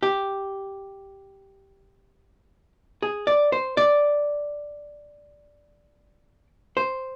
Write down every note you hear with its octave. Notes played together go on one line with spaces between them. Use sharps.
G4
G#4
D5
C5
D5
C5